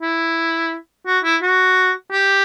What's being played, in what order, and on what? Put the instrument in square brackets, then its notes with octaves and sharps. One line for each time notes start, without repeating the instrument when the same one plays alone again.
[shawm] E4
F#4
E4
F#4
G4